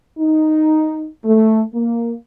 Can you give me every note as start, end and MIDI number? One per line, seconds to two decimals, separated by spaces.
0.19 1.08 63
1.25 1.62 57
1.74 2.13 58